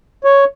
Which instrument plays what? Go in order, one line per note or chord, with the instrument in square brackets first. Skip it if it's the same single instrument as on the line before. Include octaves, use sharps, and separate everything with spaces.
[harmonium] C#5